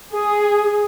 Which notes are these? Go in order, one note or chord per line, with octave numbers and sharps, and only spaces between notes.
G#4